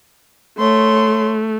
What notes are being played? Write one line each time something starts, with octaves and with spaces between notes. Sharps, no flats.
A3 C#5 C6